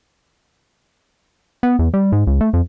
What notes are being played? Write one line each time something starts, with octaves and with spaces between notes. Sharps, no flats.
B3
E2
G3
G#2
C#2
A3
F2